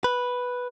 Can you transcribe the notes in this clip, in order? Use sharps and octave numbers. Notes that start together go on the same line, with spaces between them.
B4